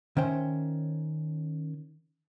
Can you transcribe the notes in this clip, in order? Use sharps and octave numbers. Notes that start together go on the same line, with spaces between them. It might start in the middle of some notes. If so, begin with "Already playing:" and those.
D#3 C#4 C5 E5 G5